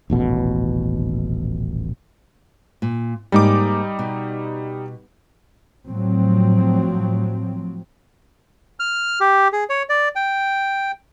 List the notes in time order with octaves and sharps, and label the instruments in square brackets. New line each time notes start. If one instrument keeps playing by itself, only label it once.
[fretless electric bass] D#1 A1 B2
[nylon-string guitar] A#2
[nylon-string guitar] G#2 A#3 [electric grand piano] G3 D#4 D6
[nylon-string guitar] B2
[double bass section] A2 F3 F#3 C4
[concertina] F6
G4
G#4
C#5
D5
G5